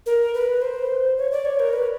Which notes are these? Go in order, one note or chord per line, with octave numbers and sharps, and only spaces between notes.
A#4
B4
C5
C#5
D5
C#5
A#4
B4